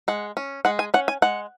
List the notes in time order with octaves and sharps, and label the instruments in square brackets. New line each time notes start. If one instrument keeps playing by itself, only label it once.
[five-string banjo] G#3 F#5
C#4
G#3 F#5
G#5
C#4 F#5
G#5
G#3 F#5